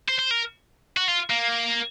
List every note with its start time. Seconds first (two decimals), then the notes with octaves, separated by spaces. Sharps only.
0.09 C5
0.19 C5
0.31 A#4
0.97 F#4
1.08 F4
1.30 A#3